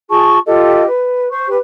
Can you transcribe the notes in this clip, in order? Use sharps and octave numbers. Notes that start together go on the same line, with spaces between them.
F4 G#4 A5 C#6
F4 G4 A4 D#5
B4
C5 C#6
G4 B4